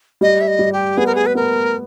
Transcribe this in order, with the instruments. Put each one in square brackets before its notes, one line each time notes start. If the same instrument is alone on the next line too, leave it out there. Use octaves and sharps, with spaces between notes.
[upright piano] G3 [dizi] D#5
[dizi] E5
D#5
[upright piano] G3
[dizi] G4
[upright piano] B3 [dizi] G#4
[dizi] A#4
G#4
B4
[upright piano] B3 [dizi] A#4